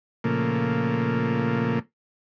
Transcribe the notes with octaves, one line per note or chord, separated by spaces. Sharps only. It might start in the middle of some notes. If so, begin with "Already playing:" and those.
A#2 C#3 F3 A3 A#3